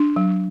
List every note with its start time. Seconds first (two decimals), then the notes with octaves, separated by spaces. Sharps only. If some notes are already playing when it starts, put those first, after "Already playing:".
Already playing: D4
0.16 F#3